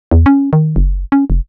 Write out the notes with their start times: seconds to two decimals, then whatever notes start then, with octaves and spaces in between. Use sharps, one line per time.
0.11 E2
0.26 C#4
0.53 D#3
0.76 F#1
1.12 C#4
1.30 F1